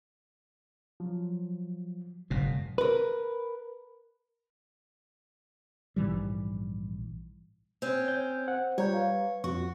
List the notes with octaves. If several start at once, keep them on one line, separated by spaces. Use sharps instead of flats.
F3 F#3
F#1 G#2 B2
A#4 B4
A#1 G#2 E3 G3
C4 C#4
C#5 G6
C5 F#5
G3 F4 C#5 A#5 G6
B4 F5
F2 F#4 C#6